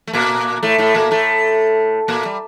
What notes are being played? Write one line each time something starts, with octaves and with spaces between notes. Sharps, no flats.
A3
A#2 A#3
A2 A3
A2 A3
A#2 A#3
A2 A3
A#2 A#3
G3